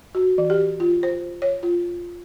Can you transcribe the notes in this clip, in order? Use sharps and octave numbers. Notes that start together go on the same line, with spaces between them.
F#4
E3
G4
F4
C5
C#5
F4